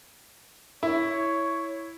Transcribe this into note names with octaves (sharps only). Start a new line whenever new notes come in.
E4 C#5